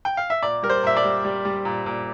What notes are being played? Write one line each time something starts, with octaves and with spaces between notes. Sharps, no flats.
G5
F5
E5
A#2 D5
G3 A#4
C5
A#2 E5
D5
G3
G3
G3
A#2
A#2